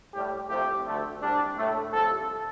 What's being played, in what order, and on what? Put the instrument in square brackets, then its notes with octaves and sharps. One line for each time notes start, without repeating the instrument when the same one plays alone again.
[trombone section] A2 G3 G4
C2 C3 F3 A3 G4
D2 D3 A3
C2 C3 G3 D4
A2 A3
C2 C3 F3 A4